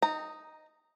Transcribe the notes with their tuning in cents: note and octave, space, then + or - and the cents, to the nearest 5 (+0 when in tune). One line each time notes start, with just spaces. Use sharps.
D#4 +0 A#5 -25